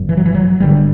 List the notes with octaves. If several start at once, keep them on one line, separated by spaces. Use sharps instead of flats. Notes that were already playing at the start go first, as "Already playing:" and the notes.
Already playing: G1 F#2
E3
F#3
E3
F#3
G1 G2 D3 G3